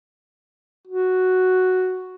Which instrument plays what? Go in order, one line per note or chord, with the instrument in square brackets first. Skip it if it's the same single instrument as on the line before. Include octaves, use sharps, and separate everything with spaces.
[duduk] F#4